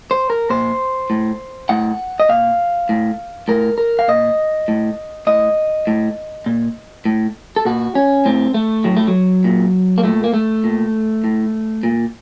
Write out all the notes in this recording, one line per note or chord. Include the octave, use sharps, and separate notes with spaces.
C5
A#4
A#2 C5
A2
A2 F#5
D#5
A#2 F5
A2
A2 A#4
A#4
F5
A#2 D#5
A2
A2 D#5
A2
A#2
A2
A4
A#2 F#4
C#4
A2 C4
A3
A2 F#3
A3
F#3
A#2
A#3
A#2 A3
A#3
A3
A#2
A2
A#2